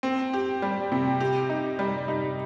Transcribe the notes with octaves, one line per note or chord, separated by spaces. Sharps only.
C4
G4
G3
C3
G4
D#4
G3
D#4